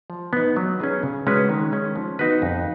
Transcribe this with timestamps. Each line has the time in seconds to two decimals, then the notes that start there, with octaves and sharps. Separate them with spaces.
0.10 F3
0.33 B3 D#4
0.56 F#3
0.80 C#4 G#4 B4
1.03 C#3
1.27 G#3 C#4 F#4 B4
1.49 D#3
1.72 G#3 C#4
1.96 F3
2.19 B3 D#4 F#4 B4
2.42 F2